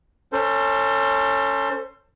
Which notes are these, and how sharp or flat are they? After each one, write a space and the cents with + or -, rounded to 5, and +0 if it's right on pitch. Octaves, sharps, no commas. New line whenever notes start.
C#4 +0 A4 +30 C5 +0